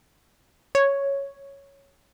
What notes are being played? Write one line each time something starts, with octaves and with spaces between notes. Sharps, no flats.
C#5